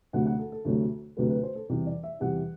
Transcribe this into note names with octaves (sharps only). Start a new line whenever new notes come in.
D2 C3 F#3 A3 F#5
F#5
A4
A4
D2 C3 F#3 A3
D2 C3 F#3 A3 B4
B4
C5
A4
E2 C3 G3
D5
E5
E2 C3 G3 F#5